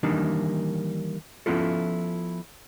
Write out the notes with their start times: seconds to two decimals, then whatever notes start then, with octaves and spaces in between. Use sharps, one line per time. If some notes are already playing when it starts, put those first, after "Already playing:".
0.03 D#3 E3 G3 A#3 D4 D#4
1.46 F3 B3 C#4 E4 F4 A4